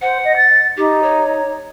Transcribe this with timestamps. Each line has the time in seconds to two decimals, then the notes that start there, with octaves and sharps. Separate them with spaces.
0.02 C5 F#5
0.24 D#5
0.37 A6
0.77 D#4 G4
1.03 C#5